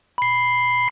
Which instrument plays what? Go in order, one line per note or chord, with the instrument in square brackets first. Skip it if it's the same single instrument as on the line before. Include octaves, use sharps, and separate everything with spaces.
[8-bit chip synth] B5 C7